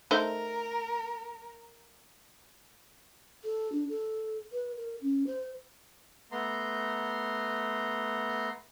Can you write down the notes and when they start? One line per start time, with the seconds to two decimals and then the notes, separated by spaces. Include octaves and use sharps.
0.11 A3 D#4 A#4 C5
3.44 A4
3.72 D4
3.89 A4
4.52 B4
4.77 A#4
5.02 C#4
5.27 C5
6.32 A3 B3 A#5 C6